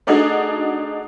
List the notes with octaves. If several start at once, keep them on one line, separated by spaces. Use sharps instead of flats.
A3 D4 D#4 F#4 G#4